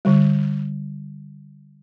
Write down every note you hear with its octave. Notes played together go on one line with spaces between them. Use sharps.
D3 G3